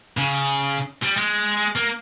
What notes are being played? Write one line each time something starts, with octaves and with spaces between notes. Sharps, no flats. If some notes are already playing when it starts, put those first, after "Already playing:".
C#3
G3
G#3
A#3